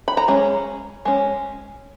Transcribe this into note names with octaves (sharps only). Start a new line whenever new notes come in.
B5
A#5
G#3 C#4
G#3 C#4